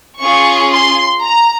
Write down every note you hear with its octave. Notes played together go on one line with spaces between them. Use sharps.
C#4 F4 G#4 C#6
C6
A#5